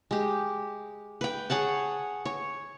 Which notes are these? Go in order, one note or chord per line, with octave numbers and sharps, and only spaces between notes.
G#3 G4
B4 G5
G#4 C#5 F#5 A5
C#5